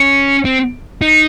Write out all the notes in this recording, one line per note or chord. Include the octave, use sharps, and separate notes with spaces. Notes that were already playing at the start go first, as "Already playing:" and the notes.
Already playing: C#4
C4
D#4